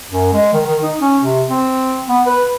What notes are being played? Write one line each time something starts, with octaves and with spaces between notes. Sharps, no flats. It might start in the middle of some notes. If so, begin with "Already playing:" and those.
F#2
G#3
D#3
D#3
D#4
C#4
C3
C4
B3
B4